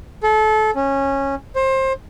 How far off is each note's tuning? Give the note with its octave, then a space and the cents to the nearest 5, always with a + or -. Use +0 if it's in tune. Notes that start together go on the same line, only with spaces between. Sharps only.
A4 -30
C#4 -15
C5 +25